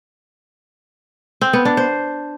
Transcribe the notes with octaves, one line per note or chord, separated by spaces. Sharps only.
C4
B3
D4
C5